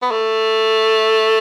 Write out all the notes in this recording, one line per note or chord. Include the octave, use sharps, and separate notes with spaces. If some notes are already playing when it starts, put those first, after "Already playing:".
B3
A3